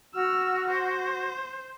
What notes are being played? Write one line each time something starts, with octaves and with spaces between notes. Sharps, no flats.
F#4 E6 F6
C5